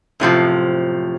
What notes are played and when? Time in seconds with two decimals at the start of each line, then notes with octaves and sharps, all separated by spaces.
0.20 F#2 A2 C3 F3